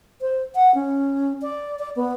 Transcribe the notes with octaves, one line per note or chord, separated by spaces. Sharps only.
C5
F#5
C#4
D5
D5
B3